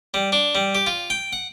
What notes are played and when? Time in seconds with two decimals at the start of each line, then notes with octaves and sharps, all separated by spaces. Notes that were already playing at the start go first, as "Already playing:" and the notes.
0.14 G3
0.32 D4
0.55 G3
0.75 G4
0.87 F4
1.10 G5
1.33 F#5